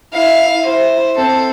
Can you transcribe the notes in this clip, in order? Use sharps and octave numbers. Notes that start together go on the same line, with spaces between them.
E4 F5
E4 C5
C4 A4